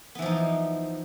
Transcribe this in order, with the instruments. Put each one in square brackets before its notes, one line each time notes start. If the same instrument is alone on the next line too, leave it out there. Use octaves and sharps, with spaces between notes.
[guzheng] B3
E3
F3
D#4